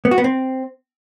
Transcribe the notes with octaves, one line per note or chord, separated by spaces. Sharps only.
B3
F#4
B3
C4